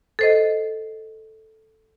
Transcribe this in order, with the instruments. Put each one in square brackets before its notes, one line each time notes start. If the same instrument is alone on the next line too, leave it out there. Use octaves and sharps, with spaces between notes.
[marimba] A4 C5 D#5